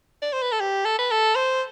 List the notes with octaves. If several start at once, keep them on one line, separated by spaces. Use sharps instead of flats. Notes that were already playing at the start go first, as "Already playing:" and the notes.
D5
C5
B4
A4
G4
A4
B4
A4
C5